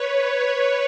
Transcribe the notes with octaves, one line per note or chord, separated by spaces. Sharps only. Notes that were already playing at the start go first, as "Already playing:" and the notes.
Already playing: B4 C#5
C#5